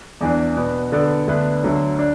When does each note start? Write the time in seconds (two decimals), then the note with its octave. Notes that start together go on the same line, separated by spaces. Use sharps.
0.21 E2 E3 D4
0.56 B2 B3 D4
0.92 D3 B3 F#4 A4 D5
1.27 D2 D3 B3 D4 B4
1.63 D2 D3 F#3
1.99 D4